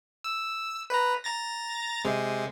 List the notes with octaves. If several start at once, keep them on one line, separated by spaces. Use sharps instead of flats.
E6
B4 A#5
A#5 A6 A#6
C3 G#3